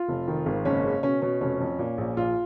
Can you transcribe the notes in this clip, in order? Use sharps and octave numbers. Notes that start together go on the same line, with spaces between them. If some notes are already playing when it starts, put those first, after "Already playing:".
Already playing: F4
F1
D#3
G#1
F#1 C#4
C#3
B2 C#4
B2 C#4
F1 C#4
F2
A#2
A#1
A#1 F4